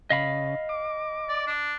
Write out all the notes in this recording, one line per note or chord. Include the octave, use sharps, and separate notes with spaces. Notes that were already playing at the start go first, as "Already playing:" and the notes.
C#3 D#5 F5 B5
D6
D5
D4